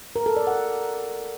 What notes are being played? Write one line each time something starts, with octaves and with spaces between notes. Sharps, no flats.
A#4
A4
D5
F#5